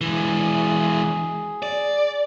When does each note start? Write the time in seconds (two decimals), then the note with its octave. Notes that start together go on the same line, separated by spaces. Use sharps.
0.01 E3 G#3 G#4
1.63 D5